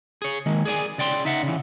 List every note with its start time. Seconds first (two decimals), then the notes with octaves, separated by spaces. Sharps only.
0.22 G#4 C#5
0.46 D#3 G#3 A#3
0.65 G#4 D5 G#5
0.98 C#3 D5 G5 C6
1.25 D#4 E5 F#5
1.43 C#3 E3